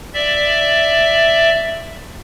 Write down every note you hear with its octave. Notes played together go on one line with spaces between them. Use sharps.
D5 E5